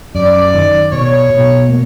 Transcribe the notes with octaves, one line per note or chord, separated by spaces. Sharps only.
F#2 D5
D#3
B2 C#5
B2
A#3